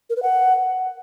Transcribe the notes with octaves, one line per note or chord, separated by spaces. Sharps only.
A#4
B4
F#5